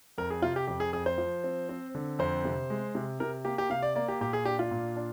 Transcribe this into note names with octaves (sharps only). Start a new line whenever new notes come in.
F2 A#4
G#4
C3 F4
G4
F2 G4
G#4
F2 G#4
C5
F3
C4
C4
D3
F2 C5
C3
G#3
C3
C3 A#4
A#3 G4
G4
C3 F5
D5
A#3 D5
G4
A#2 G4
G#4
D4 G4
F4
A#2
D4